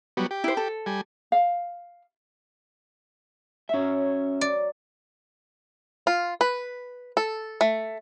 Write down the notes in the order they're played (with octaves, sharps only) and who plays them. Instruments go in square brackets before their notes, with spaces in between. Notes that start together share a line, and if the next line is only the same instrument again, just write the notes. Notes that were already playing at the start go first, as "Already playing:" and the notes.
[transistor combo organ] F#3 G3 B3
G4
[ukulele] E4 C5
A4
[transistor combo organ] G3 G#5
[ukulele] F5
[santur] F#3 E6 [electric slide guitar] C#4 E5
[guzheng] D5
[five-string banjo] F4
B4
A4
A3